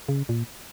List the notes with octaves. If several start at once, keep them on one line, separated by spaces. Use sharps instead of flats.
C#3
A#2